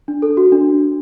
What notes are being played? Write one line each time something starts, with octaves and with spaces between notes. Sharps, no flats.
D4
A4
F#4
D4